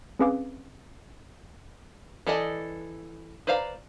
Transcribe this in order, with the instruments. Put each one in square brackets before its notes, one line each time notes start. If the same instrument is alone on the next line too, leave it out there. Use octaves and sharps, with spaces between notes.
[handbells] C4 C#4 G#4 B4 F5 D6
[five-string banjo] E3 A4 D5 D#5
B4 C5 D5 F5 A#5